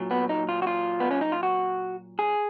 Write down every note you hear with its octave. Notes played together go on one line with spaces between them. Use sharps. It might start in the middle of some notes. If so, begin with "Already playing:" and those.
Already playing: A#2 F#3
B3
D#4
F4
F#4
F4
B3
C#4
D#4
F4
F#4
G#4